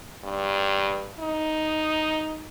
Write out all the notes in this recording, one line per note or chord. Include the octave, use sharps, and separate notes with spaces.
G2
D#4